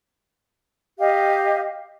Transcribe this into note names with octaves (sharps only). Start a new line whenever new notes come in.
G4 D#5 F5